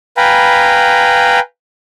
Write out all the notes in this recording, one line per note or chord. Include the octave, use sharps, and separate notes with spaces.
B4 F5 G5 G#5 A#5 B5